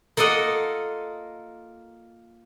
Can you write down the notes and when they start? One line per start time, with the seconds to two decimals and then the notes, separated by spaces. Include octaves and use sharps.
0.17 A#3 F4 A4 D#5 F#5